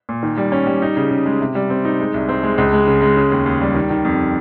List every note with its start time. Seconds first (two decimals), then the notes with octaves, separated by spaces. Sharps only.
0.09 A#2
0.23 D#3
0.37 G3
0.52 C#4
0.67 G3
0.82 D#4
0.97 C#3
1.11 C#3
1.26 G#3
1.41 C3
1.55 G3
1.70 C4
1.85 D#4
1.99 G#3
2.14 C2
2.29 C4
2.43 G#3
2.58 C#2
2.73 G#3
2.87 C#3
3.02 G#3
3.17 C#3
3.32 D#2
3.46 D#2
3.62 G3
3.75 D#3
3.90 D#3
4.05 F2